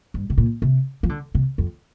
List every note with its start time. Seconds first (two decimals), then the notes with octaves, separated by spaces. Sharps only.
0.14 G2
0.30 C3
0.38 A#2
0.62 C3
1.03 F3
1.09 D3
1.35 C3
1.58 F2